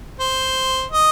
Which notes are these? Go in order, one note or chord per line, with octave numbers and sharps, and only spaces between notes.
C5
D#5